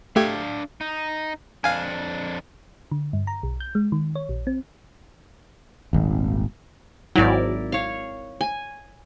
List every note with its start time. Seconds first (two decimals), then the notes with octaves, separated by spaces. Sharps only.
0.16 A3 D4 G4 F5 G#6
0.81 D#4
1.64 F2 D4 F5 G#5
2.91 D3
3.13 G2
3.27 A#5
3.43 B1
3.60 G6
3.75 G#3
3.92 D#3
4.15 C#5
4.29 A#1
4.47 C4
5.93 D#1 G#1
7.16 G#1 F#3 E4 A#4 D5
7.72 C#5 F5
8.41 G#5